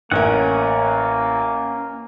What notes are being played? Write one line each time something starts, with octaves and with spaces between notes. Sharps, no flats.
A1 A#3 C#4 A#4 F#5